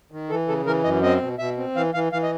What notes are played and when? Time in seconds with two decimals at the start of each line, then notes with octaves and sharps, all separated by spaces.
0.11 D#3
0.30 E3 A4
0.48 C#3 A4
0.66 E3 A#4
0.84 F#2 D#5
1.03 C4 D#5
1.21 B2
1.39 B2 E5
1.57 C4
1.75 E3 F5
1.94 E3 F5
2.12 E3 F5
2.23 D#5